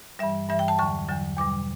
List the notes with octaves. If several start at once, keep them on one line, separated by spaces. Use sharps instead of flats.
G2 E3 G3 E5
G2 E3 G3 E5
G5
A5
E2 D3 F#3 C#6
E2 D3 F#3
E2 B2 G3 D6